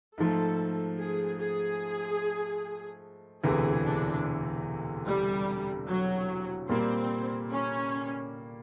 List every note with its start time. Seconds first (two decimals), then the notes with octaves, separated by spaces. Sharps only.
0.18 G#2 F3 A3 A4
0.99 G#4
1.40 G#4
3.44 E1 D2 C3 E3 G#4
3.85 D4
5.07 G3
5.88 F#3
6.69 A#2 G3 A#3 C4
7.52 C#4